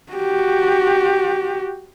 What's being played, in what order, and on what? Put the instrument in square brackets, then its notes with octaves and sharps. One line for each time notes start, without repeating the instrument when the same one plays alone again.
[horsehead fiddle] F#4 G4